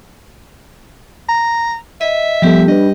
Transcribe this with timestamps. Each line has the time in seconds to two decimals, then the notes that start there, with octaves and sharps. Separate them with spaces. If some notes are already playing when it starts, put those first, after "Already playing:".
1.29 A#5
2.01 D#5 E5
2.42 F3 G3 B3 G4 A4
2.68 D4 B4 D#5